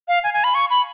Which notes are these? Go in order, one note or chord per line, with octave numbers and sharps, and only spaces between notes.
F5
G#5
G#5
B5
C#6
B5